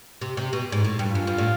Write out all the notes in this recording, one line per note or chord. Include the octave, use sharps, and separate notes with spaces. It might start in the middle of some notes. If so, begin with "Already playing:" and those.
C3
C3
B2
G#2
A2
G2
F#2 F4
G2
A2